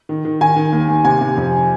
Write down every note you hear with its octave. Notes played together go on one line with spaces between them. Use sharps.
D#3
D#3
D#3 G#5
D#3
D#2
D#2
C3 G#5
C3
F2